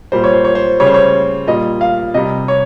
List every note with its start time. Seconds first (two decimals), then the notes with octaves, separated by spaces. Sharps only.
0.12 A#2 G3 C5
0.24 C#5
0.33 C5
0.44 C#5
0.55 C5
0.80 C#3 G3 C#5
0.87 C5
0.94 C#5
1.47 A#2 G3 D#5
1.81 F5
2.14 C3 G3 D#5
2.48 C#5